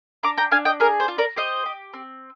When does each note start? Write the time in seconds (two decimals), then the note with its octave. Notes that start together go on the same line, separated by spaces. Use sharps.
0.23 D4 A#5 D6
0.38 G5 A#5
0.51 D4 F5 G#5
0.65 D#5 G5
0.80 G#4 A#4
1.00 C5
1.08 F4
1.18 A#4 D5
1.36 G4 C5 D#5
1.66 G4
1.94 C4